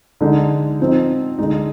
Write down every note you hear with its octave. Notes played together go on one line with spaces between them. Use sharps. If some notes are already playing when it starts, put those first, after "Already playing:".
D3 G#3 D#4
F3 C4 D#4
D3 G#3 D#4